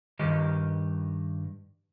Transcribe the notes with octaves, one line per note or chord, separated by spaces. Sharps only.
G2 D#3 G4 D#5